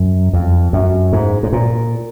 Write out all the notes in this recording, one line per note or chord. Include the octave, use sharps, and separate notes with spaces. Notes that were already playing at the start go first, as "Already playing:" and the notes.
Already playing: F#2
F2
F#2
G#2
G#2
A#2